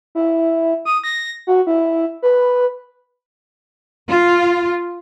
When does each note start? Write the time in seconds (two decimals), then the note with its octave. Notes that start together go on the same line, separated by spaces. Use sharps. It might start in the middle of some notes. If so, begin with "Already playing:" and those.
0.15 E4
0.85 D#6
1.04 A#6
1.47 F#4
1.67 E4
2.23 B4
4.09 F4